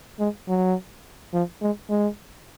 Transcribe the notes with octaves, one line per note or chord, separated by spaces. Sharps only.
G#3
F#3
F3
G#3
G#3